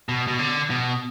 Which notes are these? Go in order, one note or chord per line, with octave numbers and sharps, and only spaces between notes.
B2
B2
D3
B2